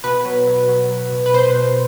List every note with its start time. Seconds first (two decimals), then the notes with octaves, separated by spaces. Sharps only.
0.04 B2 B4
0.25 F#3
0.47 F#3
0.69 F#3
0.90 F#3
1.12 B2
1.26 B4
1.34 B2 C5
1.55 B2